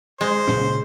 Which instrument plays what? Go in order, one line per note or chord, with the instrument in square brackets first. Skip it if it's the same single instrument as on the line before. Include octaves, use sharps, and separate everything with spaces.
[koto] G#3 [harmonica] C5
[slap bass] A#2 C#3 C#4